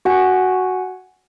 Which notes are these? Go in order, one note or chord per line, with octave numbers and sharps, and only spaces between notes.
F#4 F#5 G#5